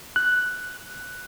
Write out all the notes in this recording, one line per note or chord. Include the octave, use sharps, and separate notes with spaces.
F#6